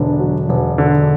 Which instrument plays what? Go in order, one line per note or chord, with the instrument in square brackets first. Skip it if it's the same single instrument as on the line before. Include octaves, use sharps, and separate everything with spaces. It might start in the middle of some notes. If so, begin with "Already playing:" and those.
Already playing: [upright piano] E1 D3 [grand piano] D4
[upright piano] F#3
E1
D3